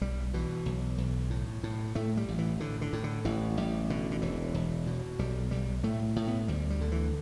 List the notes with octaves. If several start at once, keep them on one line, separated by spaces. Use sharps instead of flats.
B1 G3
B2 E3
B1
B1
A2
A2
A2 A3
G3
A1
E3
A2 D3
D3
A2
D3
A1 E3
A1 G3
B2 D3
D3
E1 E3
E1
B2
B1 G3
B1 G3
A2 A3
A2
B3
D2 G3
G3
D3
E3